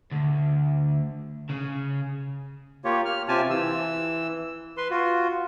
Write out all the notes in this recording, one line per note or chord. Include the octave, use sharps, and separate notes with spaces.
D2
C#3
A#3 F4 G4 C#5
F6
C3 F4 G4 G#5 A5
E3 E6
B4 C6
F4 F#4